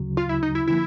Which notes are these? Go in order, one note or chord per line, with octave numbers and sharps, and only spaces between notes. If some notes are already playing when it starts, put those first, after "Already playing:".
Already playing: D2 C#3 F#3
F4
E4
D#4
E4
D3 F3 A#3 E4